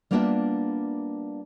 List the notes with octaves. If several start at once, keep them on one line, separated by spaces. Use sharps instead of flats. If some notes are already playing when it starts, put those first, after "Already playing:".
G3 A#3 B3 D4 F4 E5